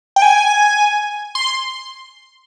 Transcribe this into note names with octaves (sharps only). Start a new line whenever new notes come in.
G5
G#5
C6